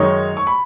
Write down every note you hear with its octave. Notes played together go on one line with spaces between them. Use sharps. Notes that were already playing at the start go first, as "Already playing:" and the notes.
Already playing: F#2 D#3 G#3 D#4 C#5
C#6
B5